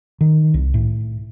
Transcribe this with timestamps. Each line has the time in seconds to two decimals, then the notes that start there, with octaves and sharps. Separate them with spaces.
0.21 D#3
0.54 C2
0.74 A2